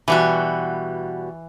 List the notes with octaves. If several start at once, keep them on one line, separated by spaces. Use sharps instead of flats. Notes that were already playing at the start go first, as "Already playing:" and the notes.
B2 E3 G3 F#4